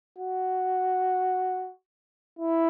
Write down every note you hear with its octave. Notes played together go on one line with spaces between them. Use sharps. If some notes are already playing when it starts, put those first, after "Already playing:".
F#4
E4